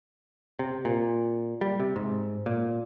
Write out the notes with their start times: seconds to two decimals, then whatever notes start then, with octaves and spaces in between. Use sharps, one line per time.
0.59 C3
0.85 A#2
1.61 G3
1.80 C3
1.96 G#2
2.46 A#2